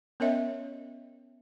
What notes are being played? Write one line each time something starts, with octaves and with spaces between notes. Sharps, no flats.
B3 C#4 A#4 C#5 D#5 E5